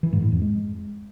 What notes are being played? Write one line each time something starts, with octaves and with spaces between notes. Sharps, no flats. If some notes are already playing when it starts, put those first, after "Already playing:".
E3
G#2
A2
F2
G#3